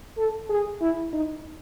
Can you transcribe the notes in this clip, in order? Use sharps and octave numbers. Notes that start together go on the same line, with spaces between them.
A4
G#4
E4
D#4